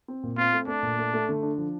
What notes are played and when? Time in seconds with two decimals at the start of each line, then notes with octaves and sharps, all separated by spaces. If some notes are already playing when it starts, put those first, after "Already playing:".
0.08 C4
0.23 A#2
0.38 C4 F4
0.53 A3
0.67 A3 D4
0.83 A#2
0.99 A3
1.14 A3
1.29 D3
1.43 D4
1.58 F3